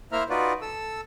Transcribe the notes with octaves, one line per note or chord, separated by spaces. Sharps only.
A#3 E4 C5 E5 A#5 F6
D#4 F4 F#4 B4 D5
A4 E6